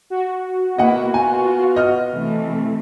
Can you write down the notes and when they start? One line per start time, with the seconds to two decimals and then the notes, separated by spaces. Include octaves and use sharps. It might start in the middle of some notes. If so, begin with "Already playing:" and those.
0.10 F#4
0.78 A#3 B3 E4 D#5 F#5
1.14 F4 G#5
1.76 D#5 F6
2.12 C3 E3 A3